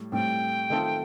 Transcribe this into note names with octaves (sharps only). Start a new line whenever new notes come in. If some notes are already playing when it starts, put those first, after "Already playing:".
Already playing: A2 G3
A2 G3 C4 G5
D#3 A3 C4 F4 A4